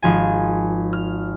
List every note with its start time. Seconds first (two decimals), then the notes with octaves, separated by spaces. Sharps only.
0.02 G#1 F3 G#5
0.93 F6